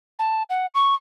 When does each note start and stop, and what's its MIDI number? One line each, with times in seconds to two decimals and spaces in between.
0.19 0.43 81
0.50 0.66 78
0.74 0.94 85